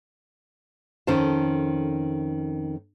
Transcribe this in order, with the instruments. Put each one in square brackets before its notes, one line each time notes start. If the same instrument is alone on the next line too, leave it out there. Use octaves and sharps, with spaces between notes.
[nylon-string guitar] F2 D#3 C#4 A4 C5 A5